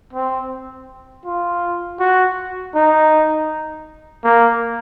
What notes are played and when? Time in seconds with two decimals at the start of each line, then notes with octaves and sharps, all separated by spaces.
0.13 C4
1.25 F4
2.00 F#4
2.75 D#4
4.25 A#3